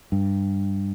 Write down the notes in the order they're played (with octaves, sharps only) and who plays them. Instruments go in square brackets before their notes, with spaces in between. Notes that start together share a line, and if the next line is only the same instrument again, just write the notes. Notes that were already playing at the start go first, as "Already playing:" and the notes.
[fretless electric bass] G2